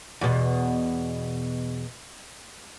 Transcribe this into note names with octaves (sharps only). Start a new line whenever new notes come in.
E2 B2